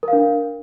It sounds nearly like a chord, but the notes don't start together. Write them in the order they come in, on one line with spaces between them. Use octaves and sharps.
A#4 F5 D4